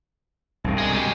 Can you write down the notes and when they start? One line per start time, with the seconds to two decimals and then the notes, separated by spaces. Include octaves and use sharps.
0.64 C2 G2 B2
0.78 G#4 D#5
0.93 G#3 G4